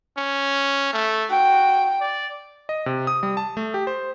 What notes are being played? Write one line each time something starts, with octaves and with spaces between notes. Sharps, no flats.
C#4
A3
F#4 G5
D5
D#5
C3
D#6
G3
A5
A3
G4
C5